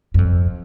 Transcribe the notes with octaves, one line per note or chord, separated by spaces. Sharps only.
F#2
F2